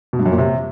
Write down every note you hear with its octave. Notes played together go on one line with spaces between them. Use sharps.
B2
G2
F#2
A#2
C3